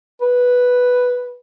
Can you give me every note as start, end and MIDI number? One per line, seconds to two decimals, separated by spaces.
0.22 1.36 71